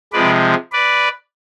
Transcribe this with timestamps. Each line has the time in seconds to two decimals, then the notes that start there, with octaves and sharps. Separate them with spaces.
0.13 C3 F3 G#3 B4 D5
0.72 B4 D5